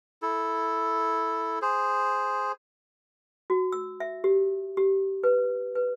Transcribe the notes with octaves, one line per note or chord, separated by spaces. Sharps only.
E4 A4
G#4 C5
F#4
E6
E5
G4
G4
B4
B4